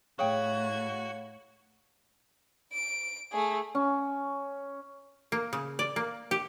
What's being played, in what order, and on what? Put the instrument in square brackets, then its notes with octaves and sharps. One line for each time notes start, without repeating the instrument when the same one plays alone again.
[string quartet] A2 G#6 [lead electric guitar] F#4 [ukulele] G#4 G5 [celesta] C#5 F5
[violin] D7
A3 G#4
[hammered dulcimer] C#4
[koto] A#3
C#3
D5
A#3
G4